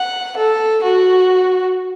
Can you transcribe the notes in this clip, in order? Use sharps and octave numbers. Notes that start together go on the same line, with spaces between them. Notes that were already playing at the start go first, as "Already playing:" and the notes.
Already playing: F#5
A4
F#4